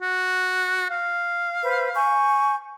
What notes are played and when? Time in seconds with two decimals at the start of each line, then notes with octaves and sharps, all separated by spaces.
0.02 F#4
0.90 F5
1.64 B4 C5
1.95 G#5 C#6 G6